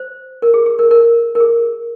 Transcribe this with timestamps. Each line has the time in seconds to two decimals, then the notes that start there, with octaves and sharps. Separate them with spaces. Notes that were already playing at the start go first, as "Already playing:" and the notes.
Already playing: C5
0.42 A#4
0.54 G#4
0.66 G#4
0.79 A#4
0.91 A#4
1.35 A#4
1.40 G#4